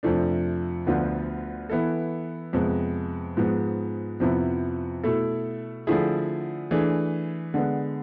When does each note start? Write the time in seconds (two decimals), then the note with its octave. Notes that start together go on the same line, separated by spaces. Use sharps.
0.03 F2 C3 F3 A3 D4
0.87 D2 D3 F3 B3 F4
1.70 E3 B3 E4 A4
2.53 F2 C3 G#3 B3
3.37 G#2 F3 G#3 B3
4.20 F2 C3 F3 B3 E4
5.04 B2 A3 E4 A4
5.87 D3 F3 A3 E4 G#4
6.71 E3 A3 D4 G#4
7.54 D3 G#3 B3